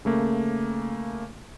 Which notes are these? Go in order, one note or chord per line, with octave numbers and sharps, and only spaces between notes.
C#3 A3 A#3